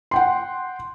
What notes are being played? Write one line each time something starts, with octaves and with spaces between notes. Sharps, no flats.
F#5 G5 C6